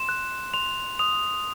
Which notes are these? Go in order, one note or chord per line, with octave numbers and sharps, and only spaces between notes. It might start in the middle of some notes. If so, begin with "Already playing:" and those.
Already playing: C6 E7
F#6
C6 F7
D#6 F7